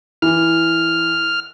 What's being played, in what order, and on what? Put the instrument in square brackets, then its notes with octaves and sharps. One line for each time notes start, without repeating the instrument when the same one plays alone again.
[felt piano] E3 [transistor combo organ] F6